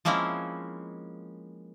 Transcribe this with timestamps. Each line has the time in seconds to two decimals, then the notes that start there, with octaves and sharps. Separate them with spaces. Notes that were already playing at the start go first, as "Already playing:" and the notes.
0.05 F3 G#3 A#3 C4 C#4 E4